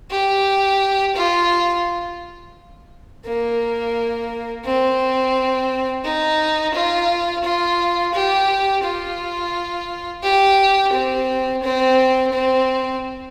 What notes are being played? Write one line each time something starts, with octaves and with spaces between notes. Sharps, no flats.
G4
F4
A#3
C4
D#4
F4
F4
G4
F4
G4
C4
C4
C4